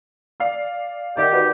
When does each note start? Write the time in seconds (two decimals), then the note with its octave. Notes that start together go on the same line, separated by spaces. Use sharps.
0.40 D5 F5
1.17 D#3 G4 D5 E5 F#5
1.33 F#4 B4 D5